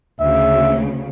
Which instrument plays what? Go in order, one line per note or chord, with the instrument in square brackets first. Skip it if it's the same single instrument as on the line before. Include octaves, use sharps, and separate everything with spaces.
[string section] D2 C#3 [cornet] E5